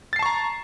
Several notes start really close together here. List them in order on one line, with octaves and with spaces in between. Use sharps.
A6 C7 A5 C#6 A#5